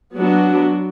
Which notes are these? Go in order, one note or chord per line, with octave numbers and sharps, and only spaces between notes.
F#3 B3 D4 F#4